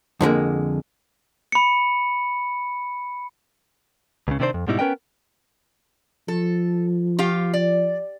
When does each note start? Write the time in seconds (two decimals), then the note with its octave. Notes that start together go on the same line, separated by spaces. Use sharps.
0.21 F2 D3 G#3 A#3
1.52 B5 C#7
4.28 C#2 C#3
4.40 C3 D#3 C4 D4 C5
4.54 F2
4.67 G#2 B2 G3 D#4 E4
4.79 B3 C#4 A#4 B4 D#5 G5
6.28 F3 A4
7.19 F4 G4 F5
7.54 D5